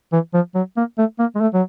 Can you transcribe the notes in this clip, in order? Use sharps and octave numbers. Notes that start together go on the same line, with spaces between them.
E3
F3
F#3
A#3
A3
A#3
G#3
A3
F#3